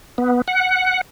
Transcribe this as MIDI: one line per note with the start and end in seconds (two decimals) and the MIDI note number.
0.18 0.42 59
0.48 1.01 78